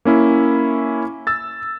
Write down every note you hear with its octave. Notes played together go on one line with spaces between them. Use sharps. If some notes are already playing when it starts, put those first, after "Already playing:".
A#3 C#4 E4
E6 A6